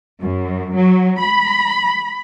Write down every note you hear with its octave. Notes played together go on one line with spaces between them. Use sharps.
F#2
F#3
B5